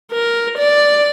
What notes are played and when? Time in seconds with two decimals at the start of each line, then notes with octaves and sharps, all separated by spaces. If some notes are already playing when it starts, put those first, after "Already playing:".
0.12 A#4
0.58 D5